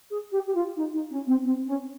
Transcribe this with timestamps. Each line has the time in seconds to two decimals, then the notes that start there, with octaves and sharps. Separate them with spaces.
0.10 G#4
0.31 G4
0.46 G4
0.54 F4
0.76 D#4
0.93 D#4
1.10 C#4
1.26 C4
1.43 C4
1.66 C#4